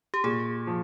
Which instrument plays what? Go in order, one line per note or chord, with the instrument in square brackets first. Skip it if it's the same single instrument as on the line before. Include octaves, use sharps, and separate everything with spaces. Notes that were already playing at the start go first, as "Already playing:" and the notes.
[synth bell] G4
[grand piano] A#2 [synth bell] G#4
[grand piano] F3